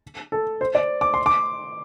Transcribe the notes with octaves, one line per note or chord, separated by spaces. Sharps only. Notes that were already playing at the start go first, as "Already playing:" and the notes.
A4
C5
D5
D6
C6
D6